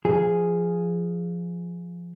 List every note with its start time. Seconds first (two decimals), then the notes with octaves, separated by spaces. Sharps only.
0.05 F3 G#4